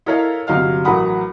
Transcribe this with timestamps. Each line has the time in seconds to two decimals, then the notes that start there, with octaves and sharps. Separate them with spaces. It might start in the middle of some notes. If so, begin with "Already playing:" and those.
0.06 E4 A4 A#4 C#5 D#5 F5
0.47 G1 C3 F#3 D#5 F5 F6
0.84 A1 F#3 A#4 F#5 B5 D#6